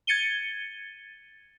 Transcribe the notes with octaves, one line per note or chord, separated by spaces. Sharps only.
G#6 A6 C#7 D#7 G7